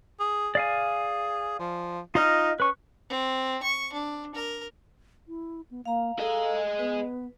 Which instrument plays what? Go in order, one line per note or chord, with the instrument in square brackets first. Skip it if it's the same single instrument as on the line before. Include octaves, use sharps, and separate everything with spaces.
[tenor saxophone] G#4
[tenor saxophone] G#4 [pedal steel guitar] D5 F5 G#5
[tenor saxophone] F3
[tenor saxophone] D#4 [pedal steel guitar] F4 D#5 F6
[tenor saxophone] C#4 [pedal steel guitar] B4 C#6
[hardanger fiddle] C4
C#6
D4
A#4
[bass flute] E4
B3
[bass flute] A#3 [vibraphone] F5 A#5
[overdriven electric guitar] G#4 D#5 [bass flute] A4
[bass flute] B3 [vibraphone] B4